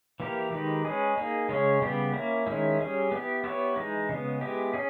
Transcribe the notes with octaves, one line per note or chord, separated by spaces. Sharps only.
E3 A#3 E4 G4 A#4
D#3 G#3 D#4 G4 B4
G#3 C#4 G#4 B4
A#3 D#4 G#4
C#3 G#3 C#4 G#4 C#5
C#3 G3 B3 G4
A#3 C#4 E4
D#3 G#3 C#4 E4
G3 C#4 G#4
B3 E4 G4
B3 E4 G4 C#5
E3 G#3 D#4
C#3 G#3 B3
G#3 B3 E4 G4
C#4 G#4